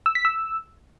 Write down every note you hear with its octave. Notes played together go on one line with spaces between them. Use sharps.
E6
B6
E6